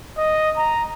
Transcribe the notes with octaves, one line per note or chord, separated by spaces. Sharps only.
D#5
A#5